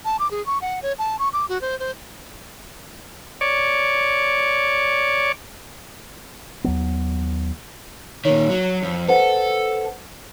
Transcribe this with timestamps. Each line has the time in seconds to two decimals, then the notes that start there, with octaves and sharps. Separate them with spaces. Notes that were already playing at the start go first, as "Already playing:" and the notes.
0.05 A5
0.19 D6
0.31 G#4
0.46 C#6
0.61 F#5
0.82 C#5
0.98 A5
1.19 C#6
1.33 D6
1.49 F#4
1.61 C5
1.79 C5
3.41 C#5 D5
6.64 D#2 F#3 B3
8.25 A#2 D#3 C#5
8.50 F#3
8.83 F2
9.09 A4 B4 C5 F#5